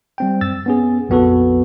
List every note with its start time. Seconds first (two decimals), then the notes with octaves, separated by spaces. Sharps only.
0.18 G3 C4 G5
0.41 F#2 E6 A6
0.66 B3 C#4 G#4
1.09 A#1 F2 B3 F#4 A4 B4